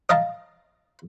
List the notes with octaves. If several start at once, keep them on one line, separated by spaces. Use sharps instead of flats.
D#5 F5 A5 A#5